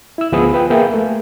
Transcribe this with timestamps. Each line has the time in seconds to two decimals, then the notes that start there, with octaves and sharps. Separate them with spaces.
0.18 E4 E6
0.32 D2 F3 B3 G#4 B5 D#6
0.53 F4 B4 G5
0.70 A#3 G#4 B4 E5 G5
0.94 A3